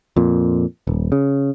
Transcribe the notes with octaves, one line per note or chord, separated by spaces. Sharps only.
F2 A#2
D#1
C#3